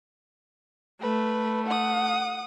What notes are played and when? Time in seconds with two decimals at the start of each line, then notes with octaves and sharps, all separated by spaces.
1.02 A3 B4
1.66 F#5 D#6